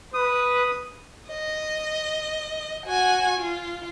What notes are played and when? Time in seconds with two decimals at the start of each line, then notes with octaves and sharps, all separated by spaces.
0.14 B4 D#6
1.29 D#5
2.87 F#4 G#5
3.40 F4